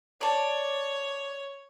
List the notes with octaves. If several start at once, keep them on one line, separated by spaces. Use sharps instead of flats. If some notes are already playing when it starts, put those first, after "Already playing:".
C#5 D5 A5